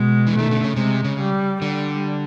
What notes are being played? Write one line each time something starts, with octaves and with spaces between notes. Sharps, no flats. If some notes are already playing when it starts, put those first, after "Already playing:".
Already playing: B2 G#3
E3
D#3 A3
D3
C#3
C3 G#3
C#3
G3
D3 G3